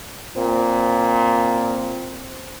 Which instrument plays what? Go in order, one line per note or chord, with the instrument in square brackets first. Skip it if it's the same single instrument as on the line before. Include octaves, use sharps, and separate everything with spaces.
[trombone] A#2 [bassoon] C4